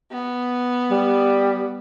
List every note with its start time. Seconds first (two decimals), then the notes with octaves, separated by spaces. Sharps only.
0.11 B3
0.91 G3